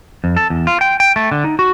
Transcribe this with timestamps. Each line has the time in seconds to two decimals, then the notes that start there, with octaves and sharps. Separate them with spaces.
0.24 F2
0.37 A4
0.50 E2
0.67 F4
0.81 G5
1.00 G5
1.16 A3
1.31 D3
1.44 D#4
1.59 F#4